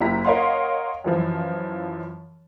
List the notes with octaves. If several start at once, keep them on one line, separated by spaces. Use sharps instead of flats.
F#1 E4 G4 A#5 B6
A#4 C#5 D#5 F5 F#5 C6
F#2 E3 F3